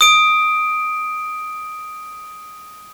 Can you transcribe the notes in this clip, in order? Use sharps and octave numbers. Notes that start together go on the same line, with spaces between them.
D#6 D7